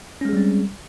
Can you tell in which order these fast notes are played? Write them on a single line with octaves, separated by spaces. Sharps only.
C#4 G#3 G#4 G3 C4